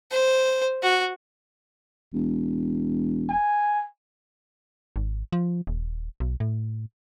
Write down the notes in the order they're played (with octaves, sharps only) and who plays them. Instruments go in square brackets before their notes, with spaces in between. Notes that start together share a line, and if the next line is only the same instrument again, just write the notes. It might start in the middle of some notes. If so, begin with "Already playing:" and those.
[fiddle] C5
F#4
[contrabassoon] E1
[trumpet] G#5
[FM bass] G#1
F3
D#1
B1
A2